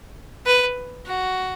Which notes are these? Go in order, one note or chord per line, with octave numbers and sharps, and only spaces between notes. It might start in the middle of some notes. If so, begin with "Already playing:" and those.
B4
F#4